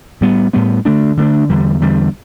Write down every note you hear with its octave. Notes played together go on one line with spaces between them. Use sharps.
A2 G3 B3
A2 G3 B3
D3 A3 D4
D3 A3 D4
E2 D3 G3
E2 D3 G3